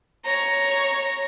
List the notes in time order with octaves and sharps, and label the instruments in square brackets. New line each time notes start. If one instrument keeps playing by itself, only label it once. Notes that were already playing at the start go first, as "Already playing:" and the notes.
[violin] C#5 A#5